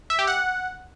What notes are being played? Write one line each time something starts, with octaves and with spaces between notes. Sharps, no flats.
E5
G4
F#5